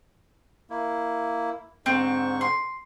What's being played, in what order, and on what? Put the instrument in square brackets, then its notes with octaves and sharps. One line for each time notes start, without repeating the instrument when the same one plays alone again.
[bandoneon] A#3 E4
[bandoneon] G#2 D3 C#6 [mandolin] C4
[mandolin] C6